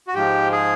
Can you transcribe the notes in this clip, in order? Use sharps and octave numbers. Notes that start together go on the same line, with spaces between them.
F#4
G#2 F3 G4
G#4